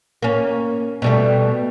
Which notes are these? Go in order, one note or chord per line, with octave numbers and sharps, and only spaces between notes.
A#3 C#4
B2 G3 A3